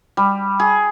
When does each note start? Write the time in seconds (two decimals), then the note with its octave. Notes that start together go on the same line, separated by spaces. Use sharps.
0.17 G3
0.60 G#4